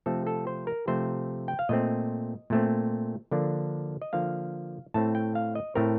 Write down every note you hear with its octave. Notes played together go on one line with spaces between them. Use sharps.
C3 F3 A3 C4 A4
A4
C5
A#4
C3 F3 A3 C4 C5
G5
F5
A#2 A3 C4 D#5
A#2 A3 C4
D3 F3 A#3 D4
D#5
D3 F3 A#3 D4 F5
A2 A3 C4 A5
G5
F5
D#5
A2 A3 C4 A#4